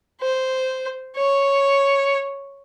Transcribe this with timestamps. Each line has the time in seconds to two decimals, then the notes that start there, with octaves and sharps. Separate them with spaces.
0.21 C5
1.16 C#5